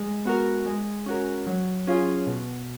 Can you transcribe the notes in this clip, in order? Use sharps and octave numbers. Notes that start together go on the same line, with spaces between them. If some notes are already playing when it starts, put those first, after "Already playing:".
Already playing: G#3
B3 F#4 A#4
G#3
C#4 F#4 A#4
F#3
C#4 F4 G#4
B2